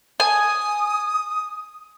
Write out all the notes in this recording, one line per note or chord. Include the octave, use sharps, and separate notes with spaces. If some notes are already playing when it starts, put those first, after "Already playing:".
G#5 D#6